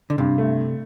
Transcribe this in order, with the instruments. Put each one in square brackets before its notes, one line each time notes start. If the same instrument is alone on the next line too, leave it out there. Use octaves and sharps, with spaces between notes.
[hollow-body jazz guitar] D3
[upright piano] G2 [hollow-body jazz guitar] C3
[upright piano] A3